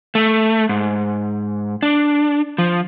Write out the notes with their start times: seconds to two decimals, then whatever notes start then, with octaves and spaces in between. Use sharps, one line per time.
0.15 A3
0.69 G#2
1.82 D4
2.58 F3